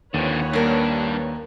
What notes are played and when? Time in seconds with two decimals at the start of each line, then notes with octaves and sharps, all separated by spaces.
0.14 D#2 D3 F3 B4 C#5 F#5
0.53 G2 A#3 D4 A#4